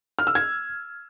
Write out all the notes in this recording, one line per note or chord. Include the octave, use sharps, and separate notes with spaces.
F6
E6
G#6